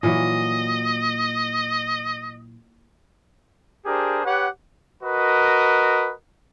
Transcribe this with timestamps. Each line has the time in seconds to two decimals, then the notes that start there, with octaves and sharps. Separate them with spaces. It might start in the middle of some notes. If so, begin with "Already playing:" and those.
0.03 A#2 E3 F#3 D#5
3.86 D4 G4 G#4 A#4 C5
4.25 G4 B4 C#5 F#5
5.03 F#4 A#4 B4 D#5